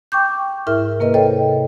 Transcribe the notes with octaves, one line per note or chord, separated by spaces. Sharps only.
G5 C#6 D6 G6
G#2 E4 A#4 E5 F6
C3 A#3 A#4 B4 D#5
A4 C5 C#5 D#5 G5